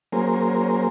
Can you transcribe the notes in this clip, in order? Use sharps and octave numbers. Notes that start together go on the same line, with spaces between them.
F#3 A#3 C#4 G#4 A#4 C5